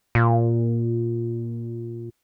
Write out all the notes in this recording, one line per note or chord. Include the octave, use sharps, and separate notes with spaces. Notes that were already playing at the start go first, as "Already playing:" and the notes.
A#2